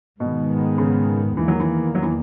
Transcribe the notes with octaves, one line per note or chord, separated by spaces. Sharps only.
G#2 B2 D#3 G#3 B3
C#3
E2 D#3 E3 A#3
F#3
E3
F#3
E3